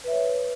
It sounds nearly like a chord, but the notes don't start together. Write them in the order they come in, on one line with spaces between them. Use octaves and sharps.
B4 E5 C#5